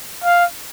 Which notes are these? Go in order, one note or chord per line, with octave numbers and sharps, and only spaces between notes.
F5